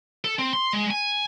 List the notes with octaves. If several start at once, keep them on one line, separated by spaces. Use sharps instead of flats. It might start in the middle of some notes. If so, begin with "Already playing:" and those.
A4
C4
C6
G#3
G#5